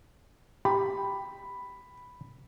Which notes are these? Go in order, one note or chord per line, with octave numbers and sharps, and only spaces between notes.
G4 B5